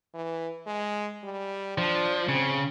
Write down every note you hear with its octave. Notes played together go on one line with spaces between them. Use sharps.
E3
G#3
G3
F3 D4
C#3 C4